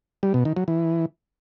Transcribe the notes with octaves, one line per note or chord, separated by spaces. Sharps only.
G3
B2
D#3
F#3
E3